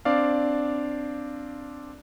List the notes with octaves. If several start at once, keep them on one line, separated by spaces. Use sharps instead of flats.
C4 D4 D5 F5